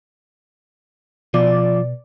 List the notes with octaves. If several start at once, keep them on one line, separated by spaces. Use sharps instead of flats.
B2 F3 D5